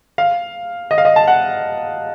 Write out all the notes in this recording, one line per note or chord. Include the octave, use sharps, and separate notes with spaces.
F5
D#5
F5
D#5
A5
F#5